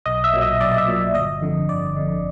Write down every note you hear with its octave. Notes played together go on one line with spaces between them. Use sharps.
B1 D#5
E5
A#2 F#3
D#5
B1 D5
E5
A#2 F#3
G1 D#5
F2 D3
G1 D5
F2 D3